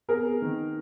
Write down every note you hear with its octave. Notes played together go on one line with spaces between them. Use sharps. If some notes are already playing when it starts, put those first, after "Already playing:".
B3 G#4 A#4
D#3